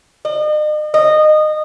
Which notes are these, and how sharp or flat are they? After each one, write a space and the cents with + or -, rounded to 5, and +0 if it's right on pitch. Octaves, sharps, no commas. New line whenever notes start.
D#5 -40
D#5 -20